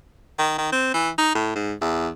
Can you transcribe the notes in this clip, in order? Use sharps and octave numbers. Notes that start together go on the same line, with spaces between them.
D#3
D#3
C4
E3
D#4
A2
G#2
E2